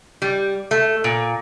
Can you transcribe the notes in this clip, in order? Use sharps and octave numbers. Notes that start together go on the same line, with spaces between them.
G3
A3
A#2